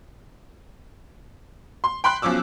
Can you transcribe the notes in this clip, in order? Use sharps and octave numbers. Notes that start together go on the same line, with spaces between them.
C6
G5 B5 C6 F#6
B1 F3 C#4 D6 E6